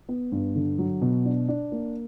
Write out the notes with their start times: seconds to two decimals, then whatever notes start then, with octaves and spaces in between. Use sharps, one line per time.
0.09 B3
0.32 G2
0.56 D3
0.79 F#3
1.02 B2
1.25 D4
1.49 D4
1.72 A#3